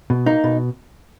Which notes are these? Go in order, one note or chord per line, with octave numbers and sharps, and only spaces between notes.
B2
A#3 D#4
B2